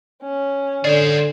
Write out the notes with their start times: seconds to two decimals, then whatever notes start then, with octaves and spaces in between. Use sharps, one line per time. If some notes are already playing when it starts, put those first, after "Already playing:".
0.23 C#4
0.85 D3 G#4 C5 D5